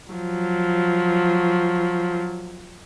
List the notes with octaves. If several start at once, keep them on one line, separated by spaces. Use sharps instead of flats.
F3 F#3